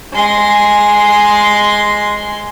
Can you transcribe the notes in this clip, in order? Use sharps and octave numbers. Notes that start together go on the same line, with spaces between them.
G#3 C6